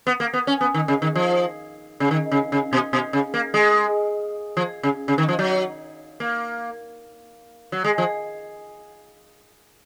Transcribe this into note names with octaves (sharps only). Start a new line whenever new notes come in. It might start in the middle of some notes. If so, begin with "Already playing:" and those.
B3
A#3
B3
C#4
B3
D#3
C#3
D#3
F3
C#3
D#3
C#3
C#3
B2
B2
C#3
A#3
G#3
F3
C#3
C#3
D#3
F3
F#3
A#3
F#3
G#3
F3